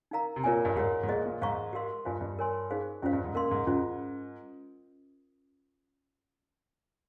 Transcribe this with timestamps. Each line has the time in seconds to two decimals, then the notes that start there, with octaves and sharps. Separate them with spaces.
0.11 D#4 A#4 F5 A#5
0.36 C3
0.44 A#2 F4 A#4 C#5 G#5
0.65 G2
0.76 G#2 G4 A#4 C#5
1.03 G#2
1.08 A#2 G#4 C5 D#5
1.26 A#2
1.41 G#2 C5 F5 A#5 C#6
1.73 G4 A#4 F5 C6
2.05 G2 F4 C5 F5 G#5
2.21 G2
2.39 A#4 C#5 G#5 C6
2.71 D#4 G#4 C5 F5
3.02 G2 C#4 F4 C5 F5
3.13 G2
3.24 G#2
3.35 A#2 A#4 F5 C6
3.51 G#2
3.67 G#2 C#4 F4 C5